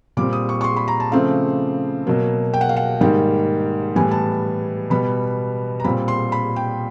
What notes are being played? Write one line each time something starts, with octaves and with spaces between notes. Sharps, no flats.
A#2 G3 C4 D6
D#6
C#6
C#6
C6
B5
A#5
A5
C#3 F3 A3 C4 F5
B2 F#3 A#3
G5
F#5
F5
F#5
G#2 D#3 G3 A#3 G5
A2 E3 G3 B3 G#5
A5
B2 G3 B3 B5
A#5
A#2 G3 C4 B5
C6
B5
G5